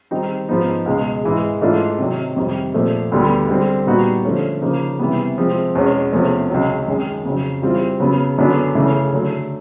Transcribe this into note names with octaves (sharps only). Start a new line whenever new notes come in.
D#3 G3 C4 D#4
G#2 F3 G#3 B3 D#4
C#2 B2 G#3
G#2 E3 G#3
G#2 E3 A3 D4 F4
C3 D#3 F#3
F2 C3 D#3 G3
A#2 F3 A3
D2 D3 G3 B3
D3 G3 C4
A#2 G3 B3 D#4 F#4
D3 F3 A3 C#4
C#3 F3 A#3 D#4
C3 E3 G3 B3
C3 F3 G#3 C4
E2 B2 G#3 C#4
E2 C3 F3 A3 C#4
C#2 C3 D#3 F#3
F#2 D#3 G#3
F2 C#3 F#3
E3 G3 C4 F4
C#3 F#3 B3
F#2 D3 F#3 B3 D4
F#2 C#3 E3 A3 C#4
D3 F#3 A3